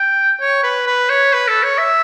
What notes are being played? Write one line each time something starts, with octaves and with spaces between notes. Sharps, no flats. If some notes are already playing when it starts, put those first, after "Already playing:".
Already playing: G5
C#5
B4
B4
C#5
B4
A4
C#5
E5